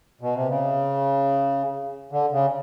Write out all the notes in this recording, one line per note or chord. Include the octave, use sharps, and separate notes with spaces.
B2
C3
C#3
D3
C#3